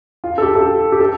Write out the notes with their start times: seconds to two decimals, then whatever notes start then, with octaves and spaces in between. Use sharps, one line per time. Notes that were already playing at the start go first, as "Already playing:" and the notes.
0.24 F4
0.38 A4
0.42 G4
0.55 A4
0.61 G4
0.92 G4
1.00 A4